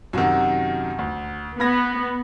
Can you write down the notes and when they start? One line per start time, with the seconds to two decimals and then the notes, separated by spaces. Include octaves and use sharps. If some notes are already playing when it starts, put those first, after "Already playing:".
0.13 F#2 C3 D#3 F#4 A4 F#5
0.99 D2
1.60 B3 B5 G#6 A#6